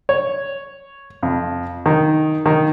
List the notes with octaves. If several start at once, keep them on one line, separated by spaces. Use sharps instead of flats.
C#5
F2
D#3
D#3